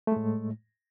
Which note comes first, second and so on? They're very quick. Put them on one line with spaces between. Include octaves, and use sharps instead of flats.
A3 G#3 A2